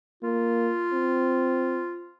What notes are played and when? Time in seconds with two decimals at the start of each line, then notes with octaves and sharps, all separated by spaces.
0.23 A#3 F4
0.93 C4